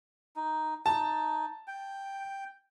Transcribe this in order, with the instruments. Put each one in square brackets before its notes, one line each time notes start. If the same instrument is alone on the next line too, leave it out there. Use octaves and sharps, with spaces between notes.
[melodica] D#4
[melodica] D#4 [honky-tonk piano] A5
[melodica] G5